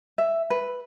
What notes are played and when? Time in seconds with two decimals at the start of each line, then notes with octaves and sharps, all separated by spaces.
0.18 E5
0.50 B4